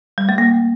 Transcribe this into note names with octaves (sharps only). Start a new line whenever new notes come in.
G3
A3
A#3